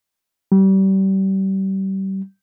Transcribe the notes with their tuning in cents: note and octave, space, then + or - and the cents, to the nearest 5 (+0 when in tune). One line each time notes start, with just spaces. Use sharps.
G3 -30